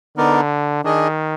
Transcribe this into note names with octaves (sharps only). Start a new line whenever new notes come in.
D3 B3 D#4 A#4 D5
D#3 D4 G#4 D#5